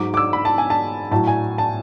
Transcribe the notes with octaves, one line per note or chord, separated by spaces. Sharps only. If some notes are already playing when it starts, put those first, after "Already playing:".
Already playing: G#2 F#3 D6
D6
E6
B5
A5
G#5
A5
A2 F#3 A5
G#5
A5